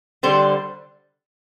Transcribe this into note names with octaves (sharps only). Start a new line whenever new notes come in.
D3 G3 C5